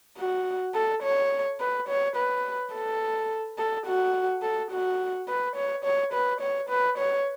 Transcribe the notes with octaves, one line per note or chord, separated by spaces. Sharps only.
F#4
A4
C#5
B4
C#5
B4
A4
A4
F#4
A4
F#4
B4
C#5
C#5
B4
C#5
B4
C#5